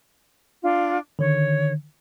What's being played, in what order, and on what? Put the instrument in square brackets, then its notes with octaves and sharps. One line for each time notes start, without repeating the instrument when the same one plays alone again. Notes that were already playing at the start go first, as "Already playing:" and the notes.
[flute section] D4 F4
[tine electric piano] D3 D#3 [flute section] C#5